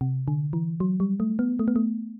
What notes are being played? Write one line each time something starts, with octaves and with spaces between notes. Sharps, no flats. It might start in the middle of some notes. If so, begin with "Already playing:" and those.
C3
D3
E3
F#3
G3
A3
B3
A3
B3
A3